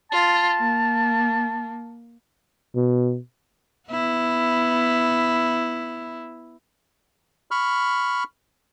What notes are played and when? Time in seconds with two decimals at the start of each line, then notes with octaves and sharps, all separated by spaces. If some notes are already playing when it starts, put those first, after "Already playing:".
0.11 F4 A5
0.58 A#3
2.75 B2
3.89 B3 E4
7.51 B5 C#6 F6